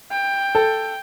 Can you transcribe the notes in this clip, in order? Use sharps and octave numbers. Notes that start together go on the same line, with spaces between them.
G5
A4